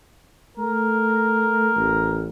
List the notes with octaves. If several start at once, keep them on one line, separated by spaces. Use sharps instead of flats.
A3 A#4
A1